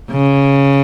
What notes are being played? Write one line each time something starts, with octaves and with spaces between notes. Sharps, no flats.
C#3